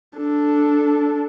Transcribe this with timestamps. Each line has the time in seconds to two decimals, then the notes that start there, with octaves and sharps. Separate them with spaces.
0.18 D4 A4